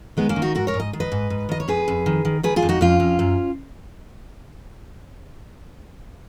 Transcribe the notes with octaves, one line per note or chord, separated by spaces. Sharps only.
D#3 G#3 B3
A#3 C#4
D#3
D#4 F#4
G#2 F#4 A#4
A#4 C#5
G#2
D#5
D#3
B4 D#5
G#2
G#2
D#3 D#5
C#5
F2 G#4 B4
F2
D#3
D#3
D#3 G#4 B4
F4 G#4
F2
D#4 F#4
F2 C#4 F4
F2
F#2